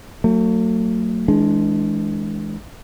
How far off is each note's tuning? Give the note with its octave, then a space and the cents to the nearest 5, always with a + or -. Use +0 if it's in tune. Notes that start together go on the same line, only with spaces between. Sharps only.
F#3 +0 A3 +40
E3 -30 G#3 +15 D4 -10